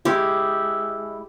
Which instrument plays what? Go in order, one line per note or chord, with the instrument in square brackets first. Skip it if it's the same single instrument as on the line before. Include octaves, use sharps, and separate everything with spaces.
[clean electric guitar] G#3 E4 [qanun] G4